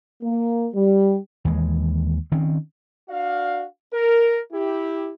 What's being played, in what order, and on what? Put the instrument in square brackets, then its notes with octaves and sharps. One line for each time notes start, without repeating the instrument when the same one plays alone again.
[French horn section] A#3
G3
[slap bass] D#2 E3 G#3
D#3 C4 C#4
[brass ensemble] D4 F#4 D5 F5
A#4
E4 G4